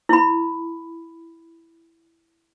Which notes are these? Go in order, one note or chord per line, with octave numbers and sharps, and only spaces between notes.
E4 B5